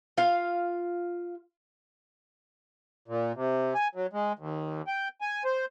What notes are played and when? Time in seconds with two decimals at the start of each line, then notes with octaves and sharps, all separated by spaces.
0.17 F4 F5
3.08 A#2
3.36 C3
3.75 G#5
3.95 F#3
4.13 G#3
4.39 D#2
4.87 G5
5.21 G#5
5.45 C5